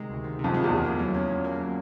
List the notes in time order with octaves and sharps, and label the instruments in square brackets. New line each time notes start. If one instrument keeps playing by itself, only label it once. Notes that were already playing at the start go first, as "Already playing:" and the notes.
Already playing: [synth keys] C3 D#3 G#3
D2
D#3
C3
[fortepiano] F2
[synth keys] G#3
[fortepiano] E2
[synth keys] D2
A#3
F#3
C#4
A#2
A#3
F#3